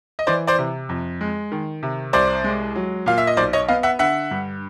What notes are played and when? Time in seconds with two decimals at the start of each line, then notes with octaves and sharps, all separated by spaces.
0.19 D#5
0.27 E3 C5 D5
0.47 C5 D5
0.58 C3
0.89 F2
1.21 G#3
1.52 D#3
1.83 C3
2.13 C2 C5 D5
2.44 G#3
2.76 F#3
3.06 A#2 F5
3.18 E5
3.27 D#5
3.37 B1 C5 D5
3.53 C#5 D#5
3.68 B3 D#5 F5
3.83 E5 F#5
3.99 D3 E5 F#5
4.31 G2